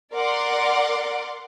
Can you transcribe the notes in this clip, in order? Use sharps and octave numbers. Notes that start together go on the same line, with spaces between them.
A#4 D5 F#5 C6 D6